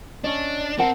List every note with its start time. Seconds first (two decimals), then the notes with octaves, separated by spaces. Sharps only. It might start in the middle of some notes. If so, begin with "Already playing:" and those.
0.24 C#4 D4 D#5
0.79 C4 A#4 F#5 A5